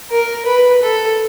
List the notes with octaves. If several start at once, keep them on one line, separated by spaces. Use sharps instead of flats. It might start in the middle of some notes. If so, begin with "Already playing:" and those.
A#4
B4
A4